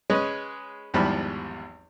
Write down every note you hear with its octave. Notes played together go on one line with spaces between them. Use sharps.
G#3 C#4 B4 C#5 D#5
G#1 E2 G#2 F3 G3 B5